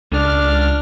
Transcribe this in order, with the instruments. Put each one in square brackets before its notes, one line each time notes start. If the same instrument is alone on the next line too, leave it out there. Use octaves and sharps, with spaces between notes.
[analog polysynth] C#2 F6 [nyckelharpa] D4